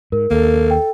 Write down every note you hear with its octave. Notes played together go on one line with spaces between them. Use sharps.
G#2 A#4
D#2 A#3 A4
G5